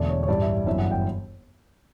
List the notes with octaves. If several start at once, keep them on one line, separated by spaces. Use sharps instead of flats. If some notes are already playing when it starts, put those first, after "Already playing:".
Already playing: E1 E2 D3 A3 D5
C#5
C#5
A1 G2 E3 G3 D5
E5
G1 F#2 E3 E5
F#5
G5